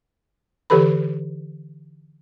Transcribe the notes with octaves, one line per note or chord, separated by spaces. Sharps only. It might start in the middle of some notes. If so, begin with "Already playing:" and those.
D3 E3 G4 A4 B4 B5